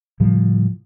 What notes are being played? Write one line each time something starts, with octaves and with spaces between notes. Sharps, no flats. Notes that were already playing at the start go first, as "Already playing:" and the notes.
A2 C#3 F3 G3